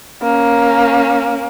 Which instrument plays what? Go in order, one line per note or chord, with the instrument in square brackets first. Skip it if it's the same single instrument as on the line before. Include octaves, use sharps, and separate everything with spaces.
[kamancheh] A#3 C#4